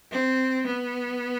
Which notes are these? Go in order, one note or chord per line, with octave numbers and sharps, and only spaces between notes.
C4
B3